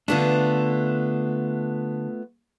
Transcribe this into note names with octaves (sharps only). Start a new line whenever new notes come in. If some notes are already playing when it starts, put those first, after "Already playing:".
D3 A3 B3 D4 F4